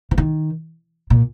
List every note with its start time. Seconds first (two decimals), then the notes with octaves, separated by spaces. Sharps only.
0.11 E3
0.18 D#3
1.10 A#2